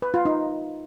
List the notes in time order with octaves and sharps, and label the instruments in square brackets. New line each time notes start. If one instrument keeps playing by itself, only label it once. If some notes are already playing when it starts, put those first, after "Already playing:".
[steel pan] B4
F4
D#4